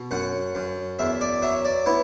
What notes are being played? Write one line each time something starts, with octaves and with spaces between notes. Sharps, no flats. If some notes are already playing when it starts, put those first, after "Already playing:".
Already playing: B2
F#2 F#5
F#2
E2 E5
D5
F#3 E5
D5
B3 E4